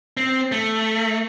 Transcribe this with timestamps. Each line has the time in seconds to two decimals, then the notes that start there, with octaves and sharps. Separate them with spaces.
0.17 C4
0.52 A3